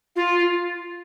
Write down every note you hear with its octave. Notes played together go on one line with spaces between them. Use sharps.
F4